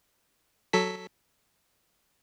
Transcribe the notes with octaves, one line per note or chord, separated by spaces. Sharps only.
F#3 A4 B6